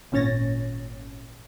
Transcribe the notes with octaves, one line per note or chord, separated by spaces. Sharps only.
G#1 A#2 C#4 C#5 A6 A#6